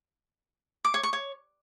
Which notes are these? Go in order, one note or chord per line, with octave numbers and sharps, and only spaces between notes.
D6
C#5
C#6
C#5